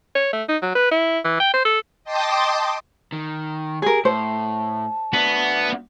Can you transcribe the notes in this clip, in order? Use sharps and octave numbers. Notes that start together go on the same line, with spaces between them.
C#5
A3
D#4
F#3
B4
E4
E3
G5
C5
A4
D#5 G5 A5 C6 D6 D#6
D#3
G4 G#4 A#4
A2 C5 A5
B3 D4 F#4